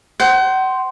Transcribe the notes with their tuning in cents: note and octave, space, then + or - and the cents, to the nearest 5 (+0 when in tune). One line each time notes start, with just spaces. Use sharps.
C5 +0 F#5 +40